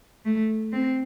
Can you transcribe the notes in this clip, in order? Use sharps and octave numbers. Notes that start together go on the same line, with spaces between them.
A3
C4